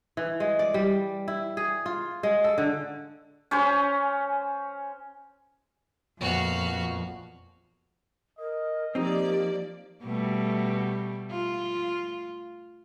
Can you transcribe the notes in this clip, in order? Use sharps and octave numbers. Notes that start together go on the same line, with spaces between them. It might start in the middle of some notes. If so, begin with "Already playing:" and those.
E3
G#3
D5
G3
E4
G#4
F4
G#3
A4
D3
C#4 C5 G#5 C6
A#1 F2 B3 F#4 F5 F#5
A#4 D#5
F3 A#3 C4 D#4 G4 D5
B2 G3 A3
F4